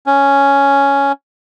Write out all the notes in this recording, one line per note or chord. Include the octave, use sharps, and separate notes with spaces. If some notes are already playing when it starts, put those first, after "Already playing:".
C#4